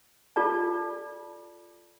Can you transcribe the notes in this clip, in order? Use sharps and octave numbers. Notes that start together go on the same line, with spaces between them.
F4 A4 D5 A5